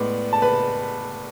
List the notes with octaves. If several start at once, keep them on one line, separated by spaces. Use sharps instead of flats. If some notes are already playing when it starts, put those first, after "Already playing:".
Already playing: A2 G#3 B3 D5
A5
B4 B5